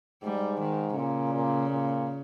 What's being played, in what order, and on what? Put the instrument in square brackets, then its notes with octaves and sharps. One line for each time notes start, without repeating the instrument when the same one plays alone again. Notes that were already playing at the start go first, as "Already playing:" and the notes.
[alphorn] G#2 [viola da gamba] G3
[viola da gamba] D#3
[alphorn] A#2 [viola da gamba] C#3
[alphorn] A#2
A#2